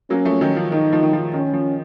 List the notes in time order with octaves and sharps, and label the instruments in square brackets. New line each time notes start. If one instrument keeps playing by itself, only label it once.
[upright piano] F#3 A#3 [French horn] C#4
[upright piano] F3 A3
D#3 F#3
F3
[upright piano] D#3 [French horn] D#4
[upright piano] F3
D#3
F3
[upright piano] D#3 [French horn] C#4
[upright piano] F3